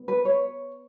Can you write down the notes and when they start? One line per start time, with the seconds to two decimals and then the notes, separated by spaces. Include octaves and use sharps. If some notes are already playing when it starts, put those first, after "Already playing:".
Already playing: B3
0.08 B4
0.25 C#5